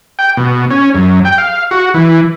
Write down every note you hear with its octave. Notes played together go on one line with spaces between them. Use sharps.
G5
B2
C#4
F#2
G5
F5
F#4
E3